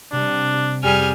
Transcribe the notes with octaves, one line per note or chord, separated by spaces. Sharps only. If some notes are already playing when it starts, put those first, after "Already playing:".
C3 G3 D4
F2 G3 G4 G#4 G#5 F6